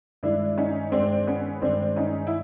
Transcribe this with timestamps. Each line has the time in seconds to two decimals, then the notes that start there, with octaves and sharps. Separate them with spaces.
0.23 G2 D#3 G#3 D4 E4
0.58 C#4 D#4
0.92 G2 D#3 G#3 C4 D4
1.27 B3 C#4
1.62 G2 D#3 G#3 C4 D4
1.96 C#4 D#4
2.27 E4